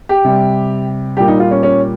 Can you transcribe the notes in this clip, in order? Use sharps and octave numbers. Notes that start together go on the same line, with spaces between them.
G4
C3 G3
A#2 G3 G4
D#4
F4
C#4
C#4